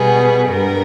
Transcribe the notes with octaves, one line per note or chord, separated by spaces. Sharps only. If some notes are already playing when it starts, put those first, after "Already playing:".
Already playing: B2 G3 B3 G#4
G2 G3 B3 A#4